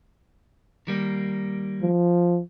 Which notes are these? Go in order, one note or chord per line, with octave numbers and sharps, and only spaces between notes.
D#3 G3 A#3
F3